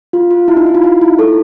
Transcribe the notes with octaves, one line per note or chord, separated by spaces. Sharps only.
F4
F4
E4
D#4
E4
F4
D#4
E4
A4